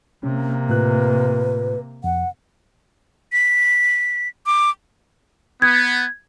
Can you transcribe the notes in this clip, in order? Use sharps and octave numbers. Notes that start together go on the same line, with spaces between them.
C3 A#3 C#4
A2 F4 B4 F#6
F2 F#5
B6
D6
B3 G#6